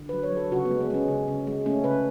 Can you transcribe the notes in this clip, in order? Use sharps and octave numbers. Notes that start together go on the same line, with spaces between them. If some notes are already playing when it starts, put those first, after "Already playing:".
Already playing: D3
F#3 B4
C#5
F#3
A4
C#3 F#4
B3
G#3
B3
G#3 C#4
C#3
C#3
G#3
A3 C#4
C#3 B4